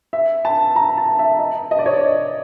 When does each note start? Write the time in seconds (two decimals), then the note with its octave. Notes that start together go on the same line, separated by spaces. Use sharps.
0.13 E5
0.45 A5
0.76 A#5
0.98 A5
1.19 E5
1.39 D#5
1.71 D#5
1.79 D5
1.86 C#5
1.93 D5